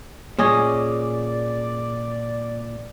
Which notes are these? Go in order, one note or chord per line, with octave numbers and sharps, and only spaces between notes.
A#2 C#4 G#4 D5 D#5